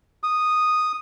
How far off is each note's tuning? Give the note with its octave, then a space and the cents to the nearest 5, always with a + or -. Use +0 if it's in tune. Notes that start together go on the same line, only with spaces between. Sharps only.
D#6 -5